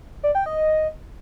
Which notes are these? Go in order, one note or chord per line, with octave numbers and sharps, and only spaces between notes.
D5
G5
D#5